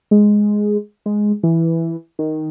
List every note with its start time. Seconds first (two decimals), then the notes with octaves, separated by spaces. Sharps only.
0.11 G#3
1.06 G#3
1.43 E3
2.19 D#3